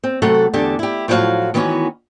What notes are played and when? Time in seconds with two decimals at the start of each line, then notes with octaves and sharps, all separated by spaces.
0.04 C4
0.22 C3 F#3 A3 A4 F#5
0.53 E2 D3 G4 A5
0.79 E4 G4
1.08 A2 F3 F#3 C#4 F#4 F5
1.54 D#3 E3 B3 C#4 F#4